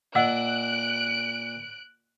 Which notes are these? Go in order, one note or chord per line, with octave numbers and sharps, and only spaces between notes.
A#2 D#5 F#5 E6 F#6 D7